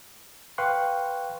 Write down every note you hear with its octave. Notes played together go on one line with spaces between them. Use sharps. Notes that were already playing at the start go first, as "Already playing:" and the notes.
B4 F5 G5 C6 C#6 F#6